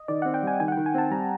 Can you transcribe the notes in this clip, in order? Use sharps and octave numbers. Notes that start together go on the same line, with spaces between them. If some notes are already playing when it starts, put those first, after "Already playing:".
Already playing: D#5
D#3 D5
F#5
C4
G5
G3 G#5
D#3 G#5
F#5
G5
D#3
G#5
C4 A5
G3 A#5